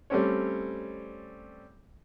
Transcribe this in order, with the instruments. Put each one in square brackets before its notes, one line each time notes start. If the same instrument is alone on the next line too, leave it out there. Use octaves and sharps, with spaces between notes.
[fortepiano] G3 A3 C4 C#4 C#5